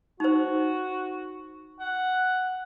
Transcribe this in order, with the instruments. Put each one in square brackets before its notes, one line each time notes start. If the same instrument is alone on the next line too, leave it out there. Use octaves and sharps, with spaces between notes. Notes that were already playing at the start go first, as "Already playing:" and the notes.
[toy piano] D#4 C5 [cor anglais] F#4
[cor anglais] F#5